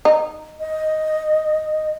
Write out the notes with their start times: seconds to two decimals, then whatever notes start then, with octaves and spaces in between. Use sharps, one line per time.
0.05 D#4
0.60 D#5